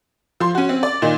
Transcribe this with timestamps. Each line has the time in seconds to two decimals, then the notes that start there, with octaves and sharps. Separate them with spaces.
0.40 F3 C6
0.55 C#4 F#4
0.69 C4
0.83 D5
1.02 A#2 D#3 D#4